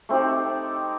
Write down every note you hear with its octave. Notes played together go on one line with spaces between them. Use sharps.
A3 C4 D#4 G4